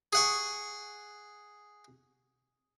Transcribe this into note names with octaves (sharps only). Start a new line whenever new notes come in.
G#4 F#5 C#6